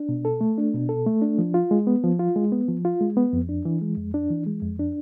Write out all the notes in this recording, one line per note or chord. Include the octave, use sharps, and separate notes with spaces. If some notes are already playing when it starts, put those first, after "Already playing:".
Already playing: D4
B2
A4
A3
D4
B2
A4
A3
D4
F3
F4
G#3
B3
F3
F4
G#3
B3
F3
F4
G#3
B3
F2
D4
E3
G#3
F2
D4
E3
G#3
F2
D4